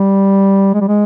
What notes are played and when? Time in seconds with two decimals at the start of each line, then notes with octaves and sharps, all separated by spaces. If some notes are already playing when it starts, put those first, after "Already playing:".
Already playing: G3
0.74 G#3
0.81 G3
0.88 G#3